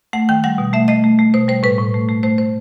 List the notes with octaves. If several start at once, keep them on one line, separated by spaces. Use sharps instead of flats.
A3 F#5
D#3 G5
G3 F#5
B2
A3 E5
A3 D#5
A3
A3
B2 C5
G3 C5
A2 B4
A2
A3
A3
A3 C5
C5